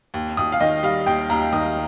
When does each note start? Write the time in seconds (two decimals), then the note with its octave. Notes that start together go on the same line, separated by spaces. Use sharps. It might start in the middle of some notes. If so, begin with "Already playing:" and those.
0.14 D#2
0.37 D#2 D#6
0.52 F5
0.60 D#3 D#5
0.83 G3 F5
1.06 D#2 G5
1.30 D#2 A#5
1.53 D#3 D#6